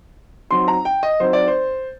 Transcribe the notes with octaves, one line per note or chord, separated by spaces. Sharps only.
F#3 C4 D#4 C6
A#5
G5
D#5
F#3 C4 D#4 C5
D5
C5